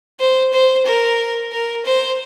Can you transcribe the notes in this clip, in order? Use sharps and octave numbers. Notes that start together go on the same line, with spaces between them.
C5
C5
A#4
A#4
C5